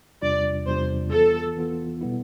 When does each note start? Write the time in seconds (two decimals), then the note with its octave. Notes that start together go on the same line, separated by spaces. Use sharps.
0.22 E2 C3 G3 D4 F4 D5
0.66 E2 C3 G3 D4 F4 C5
1.12 E3 B3 F4 A4
1.57 E3 B3 F4
2.01 B2 G3 B3 E4